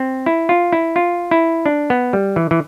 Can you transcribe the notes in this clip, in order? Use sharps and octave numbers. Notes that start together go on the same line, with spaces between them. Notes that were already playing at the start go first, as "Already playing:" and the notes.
Already playing: C4
E4
F4
E4
F4
E4
D4
B3
G3
E3
E3